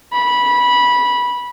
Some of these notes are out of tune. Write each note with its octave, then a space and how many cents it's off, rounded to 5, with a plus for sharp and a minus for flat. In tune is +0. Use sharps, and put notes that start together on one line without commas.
B5 -15